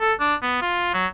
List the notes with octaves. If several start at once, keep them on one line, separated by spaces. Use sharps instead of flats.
A4
D4
B3
F4
F#3